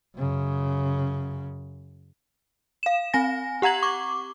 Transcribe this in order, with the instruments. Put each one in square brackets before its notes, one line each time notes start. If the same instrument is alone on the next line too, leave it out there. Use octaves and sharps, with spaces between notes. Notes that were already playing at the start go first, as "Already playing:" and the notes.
[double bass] F#2 C#3
[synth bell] F5 E7
C4 G#5 A#6
G4 F#5 A#5 G#6 F#7
C#6 D6